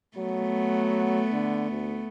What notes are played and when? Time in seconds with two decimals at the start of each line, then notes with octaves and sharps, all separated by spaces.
0.17 F#3 A3 B3
1.32 D3
1.71 D2